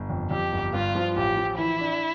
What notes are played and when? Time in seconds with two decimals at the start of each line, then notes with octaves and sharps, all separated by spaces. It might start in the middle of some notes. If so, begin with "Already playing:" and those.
Already playing: G1
0.10 F2
0.31 F2 G4
0.52 G1
0.73 G2 F4
0.95 F3
1.16 A1 G4
1.37 F3
1.58 E3 E4
1.80 D4